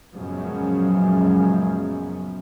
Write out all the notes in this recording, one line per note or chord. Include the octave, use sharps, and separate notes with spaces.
F#2 A#2 C#3 F3 G#3 B3